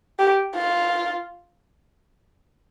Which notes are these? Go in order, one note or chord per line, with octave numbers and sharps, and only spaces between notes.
G4
F4